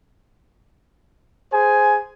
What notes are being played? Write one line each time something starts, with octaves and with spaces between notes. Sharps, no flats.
G#4 C5 G#5